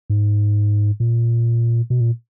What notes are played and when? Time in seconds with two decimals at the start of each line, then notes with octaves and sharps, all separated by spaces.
0.10 G#2
1.00 A#2
1.90 B2
2.01 A#2